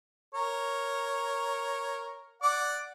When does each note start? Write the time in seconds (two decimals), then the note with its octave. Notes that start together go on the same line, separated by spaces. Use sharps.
0.34 A#4 C#5
2.42 D5 F#5 D6